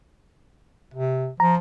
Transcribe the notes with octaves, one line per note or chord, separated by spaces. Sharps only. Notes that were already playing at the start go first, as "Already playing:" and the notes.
C3
F3 A#5